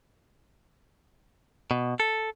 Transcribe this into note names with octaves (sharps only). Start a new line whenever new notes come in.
B2
A4